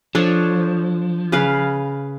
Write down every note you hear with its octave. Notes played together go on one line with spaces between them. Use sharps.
F3 D4 A4 C#5
C#3 B4 F5